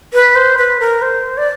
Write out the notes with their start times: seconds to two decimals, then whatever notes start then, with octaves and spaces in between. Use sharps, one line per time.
0.14 B4
0.35 C5
0.58 B4
0.80 A#4
1.02 C5
1.38 D5